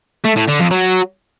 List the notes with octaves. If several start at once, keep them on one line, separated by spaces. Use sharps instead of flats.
A3
A2
D3
F2
F#3